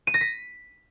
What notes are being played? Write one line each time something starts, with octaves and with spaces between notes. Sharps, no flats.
D#7
A#6
B6